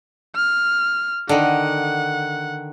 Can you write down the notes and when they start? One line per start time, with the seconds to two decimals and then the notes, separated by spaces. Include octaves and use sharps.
0.35 F6
1.29 D3 D#3 F#5